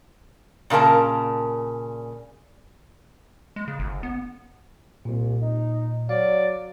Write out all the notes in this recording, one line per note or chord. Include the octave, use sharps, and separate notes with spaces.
A#2 C#3 A4 A#4 A5
G#3
C#3
G1
B3
C2 A#2
D#4
F#3 D5 F5